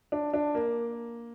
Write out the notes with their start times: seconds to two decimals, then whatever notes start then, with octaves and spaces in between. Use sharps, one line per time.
0.12 D4
0.34 D4
0.55 A#3